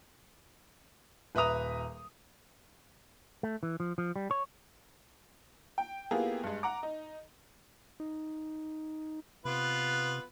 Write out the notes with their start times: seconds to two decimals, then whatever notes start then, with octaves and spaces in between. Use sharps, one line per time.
1.35 D#1 B4 E5 A#5 D#6 F7
3.43 A3
3.63 E3
3.80 F3
3.98 F3
4.16 G3
4.31 C#5
5.78 G5
6.11 A#3 B3 E4 F4 G4 G#4
6.43 G2 G#3
6.63 F#5 A#5 D6
6.83 D#4
8.00 D#4
9.45 C3 B3 F4 B4